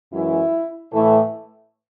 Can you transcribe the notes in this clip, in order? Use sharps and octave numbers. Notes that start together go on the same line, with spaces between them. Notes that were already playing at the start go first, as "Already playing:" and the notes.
F#2 E3 G#3 E4
A2 E3 A3